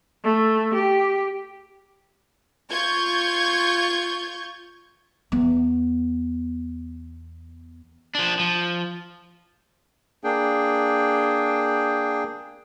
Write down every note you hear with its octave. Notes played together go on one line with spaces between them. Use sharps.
A3
G4
F4 C#6 G6 G#6
E2 B3
F3 D4
F3
A#3 D4 G#4 G5